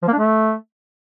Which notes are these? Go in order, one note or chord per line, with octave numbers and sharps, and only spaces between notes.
F3
A#3
D4
A3